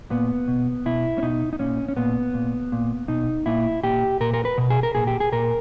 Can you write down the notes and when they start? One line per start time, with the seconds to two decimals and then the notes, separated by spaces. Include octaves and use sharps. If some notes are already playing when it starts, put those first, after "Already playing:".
0.11 A#2 B3
0.48 B2
0.86 B2 E4
1.18 C#4
1.22 B2 D#4
1.53 D#4
1.59 A#2 C#4
1.88 C#4
1.97 A#2 B3
2.34 A#2
2.72 A#2
3.08 B2 D#4
3.46 A#2 E4
3.83 A#2 G4
4.20 A#2 A#4
4.34 A#4
4.45 B4
4.58 B2
4.70 G#4
4.83 A#4
4.95 A#2 G#4
5.07 G4
5.20 G#4
5.32 A#2 A#4